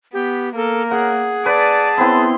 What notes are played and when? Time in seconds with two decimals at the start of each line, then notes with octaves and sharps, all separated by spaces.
0.13 B3 G4
0.56 A#3 A4 A#4
0.91 G#4 F#5
1.46 B4 D5 A5
1.98 B3 C4 E4 C6